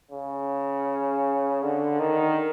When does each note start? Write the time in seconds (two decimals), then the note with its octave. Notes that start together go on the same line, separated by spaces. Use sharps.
0.11 C#3
1.62 D3
2.00 D#3